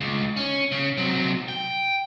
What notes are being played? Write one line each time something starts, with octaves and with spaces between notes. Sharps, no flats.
C#2
C#4
C#3
C3 F#3
G5